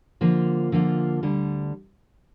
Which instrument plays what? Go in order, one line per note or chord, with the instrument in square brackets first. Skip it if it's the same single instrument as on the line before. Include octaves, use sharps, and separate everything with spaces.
[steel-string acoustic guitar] D3 F3 A#3 F4
D3 F3 A#3 F4
D2 D3 G3